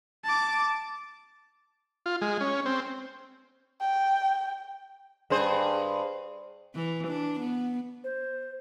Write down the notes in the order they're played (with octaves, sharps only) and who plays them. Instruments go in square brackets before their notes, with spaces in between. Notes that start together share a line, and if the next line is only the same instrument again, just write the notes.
[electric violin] A5 D6
[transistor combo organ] F4
G#3
C#4
C4
[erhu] G5
[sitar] G2 G#4 C5
[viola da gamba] E3
D4
B3
[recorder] C5